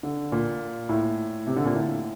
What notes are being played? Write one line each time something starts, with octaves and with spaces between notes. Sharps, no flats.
D3
A#2
A2
C3
D3
A#2
A2